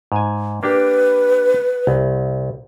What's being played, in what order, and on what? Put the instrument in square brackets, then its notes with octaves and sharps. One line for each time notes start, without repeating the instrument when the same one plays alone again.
[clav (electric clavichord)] G#2 G#5
[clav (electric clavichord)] A#3 D4 G4 [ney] B4
[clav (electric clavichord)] C2